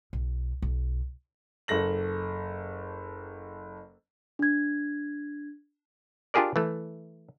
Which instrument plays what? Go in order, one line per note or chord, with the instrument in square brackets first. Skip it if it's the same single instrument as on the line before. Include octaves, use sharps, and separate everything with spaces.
[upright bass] B1
B1
[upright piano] F#1 A4 A#6 F#7
[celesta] D4 G#6
[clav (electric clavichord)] D4 F4 G4 G#4 A#4 D5
E3 A3